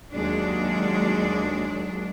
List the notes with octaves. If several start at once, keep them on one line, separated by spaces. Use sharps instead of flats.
D#2 F#3 G#3 D4